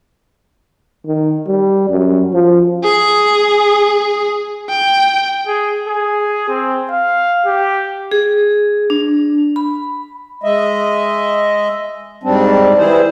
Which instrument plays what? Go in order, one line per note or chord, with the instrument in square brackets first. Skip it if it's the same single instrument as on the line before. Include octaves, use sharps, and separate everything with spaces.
[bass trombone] D#3
G3
F#2
F3
[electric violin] G#4
G5
[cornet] G#4
G#4
C4
F5
G4
[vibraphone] G#4
D4
B5
[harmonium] G#3 D#5 E5
G#2 G3 C4 D4
E3 G3 E4 G#4 C5